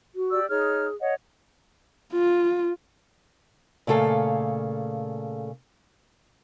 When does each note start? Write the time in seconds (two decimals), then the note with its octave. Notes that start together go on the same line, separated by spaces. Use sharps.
0.15 F#4
0.31 G4 D5 E6
0.49 D#4 G#4 C#5 F6
1.00 C#5 D#5 F#5
2.13 F4
3.87 A#2 C#3 A3 A4 F5